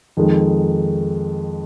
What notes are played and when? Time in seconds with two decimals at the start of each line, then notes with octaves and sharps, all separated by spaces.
0.17 F2 D#3 G#3